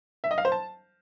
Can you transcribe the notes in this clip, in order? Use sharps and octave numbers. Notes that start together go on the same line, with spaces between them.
E5
D#5
F5
C5
A5